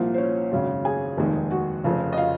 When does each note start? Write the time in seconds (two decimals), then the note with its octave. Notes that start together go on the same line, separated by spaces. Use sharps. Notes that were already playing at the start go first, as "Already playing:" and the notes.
Already playing: C2 A#2 F3 A#3
0.14 C5
0.18 C#4 C#5
0.52 G#1 F#2 C#3
0.85 G#4 G#5
1.17 F1 D#2 D#3 G#3
1.51 F#4 F#5
1.84 F1 F2 C#3
2.13 D#5
2.17 F4 F5